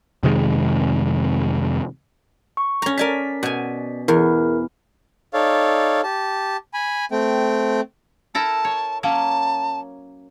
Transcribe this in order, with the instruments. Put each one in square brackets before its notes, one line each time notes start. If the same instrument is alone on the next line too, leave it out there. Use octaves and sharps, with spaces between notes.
[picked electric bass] F2 C3 D#3 G#3
[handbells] C#6
[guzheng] C#4 A#5
[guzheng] A#4 G#5 A5 [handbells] D5 B6
[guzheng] B2 G#5
[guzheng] E2 [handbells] E4 A#4
[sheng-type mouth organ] D#4 A4 C#5 D5 F5
G4 A5
G#5 B5
A3 C4 G5
[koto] E4 A4 A#4 [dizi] A5
[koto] C#5
[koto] F#3 A#3 C#4 [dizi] A5